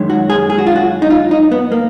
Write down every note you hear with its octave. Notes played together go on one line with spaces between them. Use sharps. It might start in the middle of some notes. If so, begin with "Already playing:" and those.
Already playing: F#2 D#3 G#3
F#4
G#4
G#4
F#4
F4
F#4
D#4
F4
D#4
B3
A#3